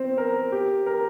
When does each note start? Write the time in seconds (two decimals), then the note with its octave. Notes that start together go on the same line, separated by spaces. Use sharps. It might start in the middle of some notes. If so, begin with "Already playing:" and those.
Already playing: C4
0.18 A#4
0.52 G4
0.86 A#4